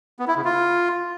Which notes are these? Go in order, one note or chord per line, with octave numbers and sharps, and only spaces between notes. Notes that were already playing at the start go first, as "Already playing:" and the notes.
B3
E4
C#3
F4